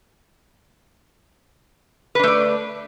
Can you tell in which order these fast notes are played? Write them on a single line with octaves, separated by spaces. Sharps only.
B4 D4 A3 D5